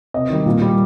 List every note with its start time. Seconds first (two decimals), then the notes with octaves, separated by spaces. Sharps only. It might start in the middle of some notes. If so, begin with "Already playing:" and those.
0.14 C3 D#5
0.30 D#3 G3
0.46 A#2
0.62 G3